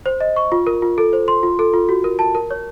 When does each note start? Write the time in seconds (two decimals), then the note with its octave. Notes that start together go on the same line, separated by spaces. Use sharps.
0.06 C5
0.21 D#5
0.36 C#6
0.52 F4
0.67 A#4
0.82 F4
0.98 A4
1.13 C5
1.28 C6
1.43 F4
1.59 A4
1.74 F4
1.89 F#4
2.04 A#4
2.19 A5
2.35 A#4
2.51 C#5